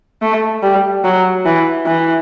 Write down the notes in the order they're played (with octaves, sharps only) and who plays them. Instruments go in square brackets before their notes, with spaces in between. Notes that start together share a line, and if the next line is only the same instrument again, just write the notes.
[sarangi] A3
G3
F#3
E3
E3